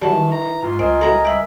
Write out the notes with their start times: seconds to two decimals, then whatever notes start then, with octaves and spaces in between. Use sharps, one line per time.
0.02 D#3 E3 F#3 G3 A5
0.32 A#5
0.63 G#2 F4
0.79 C#2 C4 A#4 D#5 G#5
1.01 B2 E4 A4 A#5
1.25 E5 G5 B5